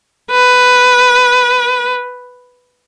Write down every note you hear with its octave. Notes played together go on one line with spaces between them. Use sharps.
B4